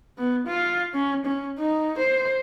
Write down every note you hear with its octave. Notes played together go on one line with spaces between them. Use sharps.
B3
F4
C#4
C#4
D#4
C5